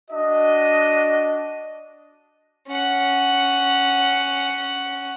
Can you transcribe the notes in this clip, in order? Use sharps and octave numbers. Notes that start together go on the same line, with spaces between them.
D4 F#4 D#5
C#4 F#5